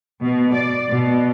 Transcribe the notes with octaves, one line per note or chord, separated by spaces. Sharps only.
B2
D5
B2